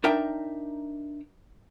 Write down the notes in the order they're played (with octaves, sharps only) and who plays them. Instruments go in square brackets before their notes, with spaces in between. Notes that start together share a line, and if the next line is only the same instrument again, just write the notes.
[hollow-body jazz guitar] D4 D#4 A#4 E5 G5